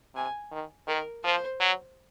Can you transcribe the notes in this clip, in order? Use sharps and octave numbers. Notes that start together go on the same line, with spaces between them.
C3 G#5
D#3
D#3 A#4
F3 C5
F#3